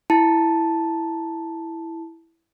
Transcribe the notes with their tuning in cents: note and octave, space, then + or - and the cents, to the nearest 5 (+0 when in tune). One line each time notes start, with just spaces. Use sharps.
E4 +0 A5 +0